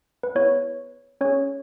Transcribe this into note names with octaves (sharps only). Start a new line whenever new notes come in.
B4
B3 E4 G#4 C#5
C#4 G#4 C#5